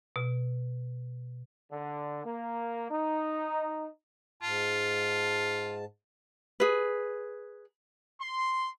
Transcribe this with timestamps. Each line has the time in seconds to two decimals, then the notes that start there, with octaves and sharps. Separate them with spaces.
0.16 B2
1.72 D3
2.25 A#3
2.91 D#4
4.43 G#2 F4 A5
6.60 G#4 B4
8.21 C6